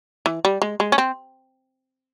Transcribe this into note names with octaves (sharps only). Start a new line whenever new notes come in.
E3
G3
G#3
G#3
C#4
C4